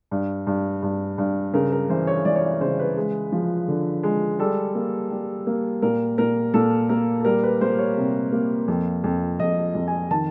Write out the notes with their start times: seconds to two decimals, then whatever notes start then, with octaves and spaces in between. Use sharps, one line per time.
0.11 G2
0.47 G2
0.83 G2
1.18 G2
1.53 C#3 A#4
1.72 A#4
1.89 E3 C5
2.07 C#5
2.25 E3 D5
2.36 C#5
2.42 D5
2.61 C#3 C5
2.79 B4
2.97 G#3
3.32 F3
3.68 D3
4.03 G#3
4.39 G3 A4
4.75 A#3
5.11 G3
5.47 A#3
5.82 A#2 A#4
6.18 A#2 A#4
6.54 A#2 A4
6.89 A#3 A#4
7.20 A4
7.25 G3 A#4
7.43 B4
7.61 A#3 C5
7.79 C#5
7.97 C3
8.32 A#3
8.68 F2
9.04 F2
9.40 F2 D#5
9.75 F2
9.88 G#5
10.11 D#3 A5